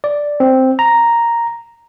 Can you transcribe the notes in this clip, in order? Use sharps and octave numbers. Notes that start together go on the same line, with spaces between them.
D5
C4
A#5